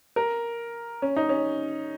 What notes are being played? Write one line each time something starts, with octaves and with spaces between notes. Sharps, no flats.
A#4
C#4
D#4
C#4